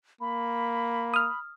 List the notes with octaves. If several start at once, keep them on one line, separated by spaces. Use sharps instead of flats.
A#3 B5
D#6 F6